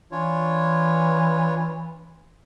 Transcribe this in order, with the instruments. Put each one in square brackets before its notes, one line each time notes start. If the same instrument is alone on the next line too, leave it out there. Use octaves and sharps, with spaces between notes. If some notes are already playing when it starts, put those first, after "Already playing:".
[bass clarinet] E3 [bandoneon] D4 F4 C#5